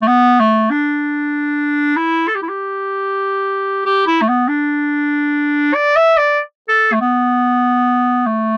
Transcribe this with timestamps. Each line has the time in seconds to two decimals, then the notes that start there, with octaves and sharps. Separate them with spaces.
0.02 A3
0.07 B3
0.40 A3
0.70 D4
1.96 E4
2.28 A4
2.35 G4
2.42 E4
2.49 G4
3.85 G4
4.07 E4
4.21 A3
4.28 B3
4.48 D4
5.74 D5
5.96 E5
6.17 D5
6.69 A4
6.92 A3
7.01 B3
8.26 A3